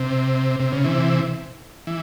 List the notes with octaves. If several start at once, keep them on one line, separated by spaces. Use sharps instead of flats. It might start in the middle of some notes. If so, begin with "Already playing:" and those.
Already playing: C3
C3
C#3
C3 E3
E3